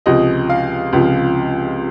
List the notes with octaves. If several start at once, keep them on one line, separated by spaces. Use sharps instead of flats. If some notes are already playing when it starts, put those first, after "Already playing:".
C#2 C3 F3 D#5
F5
C#2 C3 F3